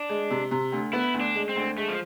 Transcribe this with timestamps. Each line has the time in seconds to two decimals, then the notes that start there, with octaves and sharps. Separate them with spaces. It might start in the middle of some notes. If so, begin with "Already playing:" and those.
Already playing: D4
0.09 G#3
0.31 C3
0.51 C3
0.72 D2
0.93 B3 E4
1.14 D2
1.21 D4
1.35 G#3
1.49 C4
1.56 D2
1.77 G#3 A3
1.88 F3